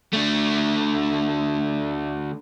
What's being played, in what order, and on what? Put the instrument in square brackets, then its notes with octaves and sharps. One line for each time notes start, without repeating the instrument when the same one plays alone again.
[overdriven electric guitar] D3 A3